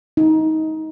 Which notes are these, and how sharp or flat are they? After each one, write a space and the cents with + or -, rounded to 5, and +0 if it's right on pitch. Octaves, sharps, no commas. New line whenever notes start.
D#4 +20